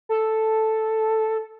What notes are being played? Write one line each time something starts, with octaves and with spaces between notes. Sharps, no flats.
A4